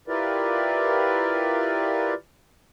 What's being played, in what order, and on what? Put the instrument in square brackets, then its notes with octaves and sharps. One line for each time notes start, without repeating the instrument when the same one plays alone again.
[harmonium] E4 F4 G4 A#4 B4 D5